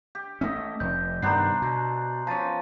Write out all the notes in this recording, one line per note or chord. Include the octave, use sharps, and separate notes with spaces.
G4
A3 B3 C#4 D#5 E5
F1 G6
G2 C3 D#3 B3 D4 C5 A#5 C7
B2
F3 C#4 A5 A6 D#7